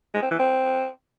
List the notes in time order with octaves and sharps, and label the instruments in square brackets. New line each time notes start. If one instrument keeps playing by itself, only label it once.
[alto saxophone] G#3
C4
E3
C4